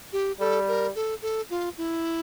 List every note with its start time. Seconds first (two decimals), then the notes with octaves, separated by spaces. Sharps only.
0.13 G4
0.40 G3 A4
0.68 A#4
0.95 A4
1.22 A4
1.50 F4
1.78 E4